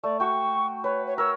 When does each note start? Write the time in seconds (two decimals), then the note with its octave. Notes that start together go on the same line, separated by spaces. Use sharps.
0.04 A3 D5
0.20 F#4 G5 C#6
0.84 B4 C#5
1.07 C#5
1.18 A#4 C#5 E6